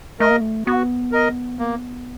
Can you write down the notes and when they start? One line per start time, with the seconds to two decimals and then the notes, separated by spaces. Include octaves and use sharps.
0.20 A3 A#4 D#5
0.31 A#3
0.41 A3
0.66 B3 F#4
1.12 A#4 D#5
1.59 A#3